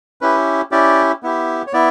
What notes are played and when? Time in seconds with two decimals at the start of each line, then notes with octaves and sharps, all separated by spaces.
0.21 C#4 E4 G4 B4
0.71 C#4 E4 G4 D5
1.23 B3 E4 G4
1.67 C#5
1.73 B3 E4 D5